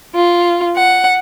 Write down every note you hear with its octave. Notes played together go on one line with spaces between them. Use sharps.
F4
F#5